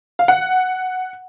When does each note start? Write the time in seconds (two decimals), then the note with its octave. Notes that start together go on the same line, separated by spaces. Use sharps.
0.19 F5
0.28 F#5